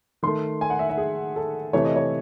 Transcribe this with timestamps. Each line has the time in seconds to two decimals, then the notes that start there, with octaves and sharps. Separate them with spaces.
0.23 D#3 A3 C6
0.61 G#5
0.70 F#5
0.79 E5
0.89 E5
0.97 G#4
1.36 A4
1.73 C3 E3 A3 C#5
1.85 D#5
1.96 C#5